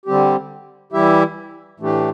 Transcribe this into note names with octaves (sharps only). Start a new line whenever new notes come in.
D3 G3 C4 G4
E3 G3 E4 G4 E5
A2 E3 A3 D4 G4